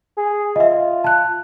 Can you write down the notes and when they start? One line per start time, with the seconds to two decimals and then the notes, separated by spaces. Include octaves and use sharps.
0.17 G#4
0.56 F4 D#5 E5
1.04 A5 F#6